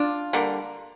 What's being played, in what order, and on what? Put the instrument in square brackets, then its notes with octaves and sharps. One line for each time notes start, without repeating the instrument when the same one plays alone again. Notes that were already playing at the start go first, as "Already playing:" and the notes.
Already playing: [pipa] D4 F4
D3 G3 A#3